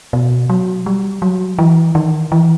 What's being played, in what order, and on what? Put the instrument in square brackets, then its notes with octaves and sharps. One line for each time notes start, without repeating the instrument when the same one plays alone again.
[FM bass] B2
F#3
G3
F#3
E3
D#3
E3